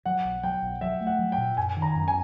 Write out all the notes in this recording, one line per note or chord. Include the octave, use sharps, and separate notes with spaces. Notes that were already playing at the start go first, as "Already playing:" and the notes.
F#3 F#5
B1
F#3 G5
B1
F#3 E5
A3
F#5
F#3
G5
A#2
F#2 G#5
D#3
A#5
F#2
G#5